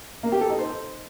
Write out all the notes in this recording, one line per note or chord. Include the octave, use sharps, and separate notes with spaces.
A#3
G4
A4
D#4
C5